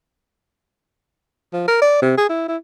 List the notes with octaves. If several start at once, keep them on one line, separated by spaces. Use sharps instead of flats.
F3
A#4
D5
C3
G#4
E4
E4